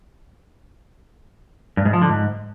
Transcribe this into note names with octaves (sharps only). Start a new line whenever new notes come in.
G2
G#2
F3
D3
G#2